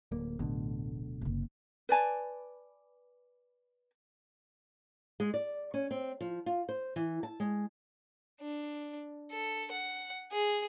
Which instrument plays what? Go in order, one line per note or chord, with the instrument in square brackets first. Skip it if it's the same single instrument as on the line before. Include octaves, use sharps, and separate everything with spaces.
[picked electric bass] D1 A#3
[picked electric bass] D1 B2 D3 [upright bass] A1
[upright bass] F#1 C3
[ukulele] B4 D5 G#5 A5
[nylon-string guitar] G#3
D5
C#4
C4
F3
F4
C5
E3
A5
G#3
[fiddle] D4
A4
F#5
G#4